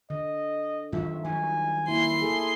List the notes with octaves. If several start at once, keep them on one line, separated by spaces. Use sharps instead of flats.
D3 D#5
F#2 D#3 F4 E5
D#3 F#3 G3 G#5
A#3 E4 C6
G#4 A4